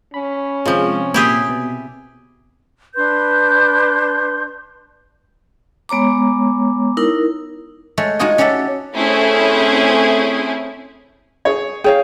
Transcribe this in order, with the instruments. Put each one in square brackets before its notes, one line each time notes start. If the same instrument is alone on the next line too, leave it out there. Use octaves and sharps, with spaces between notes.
[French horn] C#4 [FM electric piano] B5
[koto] C3 F3 [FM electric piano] G#3 F4 G#4
[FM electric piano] A#2 [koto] E4 G4 G#4
[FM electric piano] B2
[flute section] D4 B4 C6 G6
[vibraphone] G#3 B3 C#5 A#5 D6
D#4 E4 A#4
[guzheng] G#3 A3 C#5
G#3 D#4 F4 F#4 D#5 G#5
C#4 F#4 G4 A4 E5
[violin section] A3 C4 C#4 E4 G#4
[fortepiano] G#4 C#5
[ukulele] G#4 C#5 F5 [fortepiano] G5